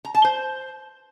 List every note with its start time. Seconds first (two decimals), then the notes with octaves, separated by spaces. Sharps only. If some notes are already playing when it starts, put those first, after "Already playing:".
0.05 A#5
0.15 A5
0.24 C5